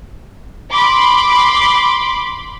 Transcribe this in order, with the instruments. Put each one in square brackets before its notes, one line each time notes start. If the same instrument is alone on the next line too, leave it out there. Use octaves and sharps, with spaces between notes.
[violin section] B5 C6 D6